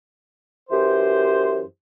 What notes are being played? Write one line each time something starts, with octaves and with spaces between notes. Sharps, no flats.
F#2 E3 G4 C5